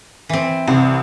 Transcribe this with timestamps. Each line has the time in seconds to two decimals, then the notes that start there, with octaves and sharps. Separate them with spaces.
0.29 E3 C4
0.67 C2 C4